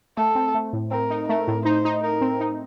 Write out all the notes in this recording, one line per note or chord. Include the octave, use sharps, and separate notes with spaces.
A3 A4
C4
A3
A2
C4 A#4
D#4
A3 A#4
A2
D#4 C5
D#4
D#4 A#4
C4
D#4